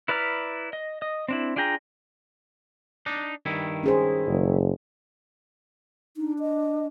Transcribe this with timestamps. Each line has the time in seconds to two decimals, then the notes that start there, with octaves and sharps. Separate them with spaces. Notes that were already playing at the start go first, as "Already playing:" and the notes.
0.08 E4 B4 D5 A#5 F6
0.73 D#5
1.02 D#5
1.28 C4 D4 E4
1.56 D4 F4 G#4 G5 A#5
3.06 D4 D#4
3.46 G2 D#3 E4
3.83 C#4 G#4 C5
4.27 F#1
6.17 D4 D#4
6.40 D#5